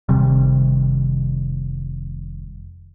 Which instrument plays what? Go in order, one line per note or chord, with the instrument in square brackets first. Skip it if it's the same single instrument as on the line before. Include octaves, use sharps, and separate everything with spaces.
[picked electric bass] F1 C3 D#3 G3